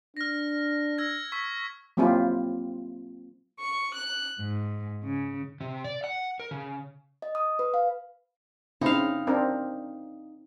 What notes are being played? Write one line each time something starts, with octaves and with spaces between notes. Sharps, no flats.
D4 F6 A#6
E6 G#6 A#6
C#6 E6 B6
F#3 A#3 C4 E4 F4 G4
C#6
F#6
G#2
C#3
C3
D5
F#5
A#4
C#3
D#5
D#6
B4
F5
C#3 C4 D#4 E4 F5
C4 D4 A#4